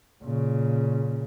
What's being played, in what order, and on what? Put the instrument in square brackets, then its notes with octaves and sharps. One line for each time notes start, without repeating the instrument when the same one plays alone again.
[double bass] A#2 C#3